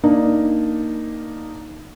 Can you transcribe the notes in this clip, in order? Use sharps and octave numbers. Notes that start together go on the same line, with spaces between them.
A#3 D4 D#4